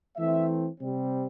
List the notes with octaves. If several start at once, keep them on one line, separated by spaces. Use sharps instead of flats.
E3 A3 C4 E5
C3 G3 C4